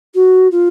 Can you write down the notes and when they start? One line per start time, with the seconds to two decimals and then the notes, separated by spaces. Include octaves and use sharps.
0.14 F#4
0.51 F4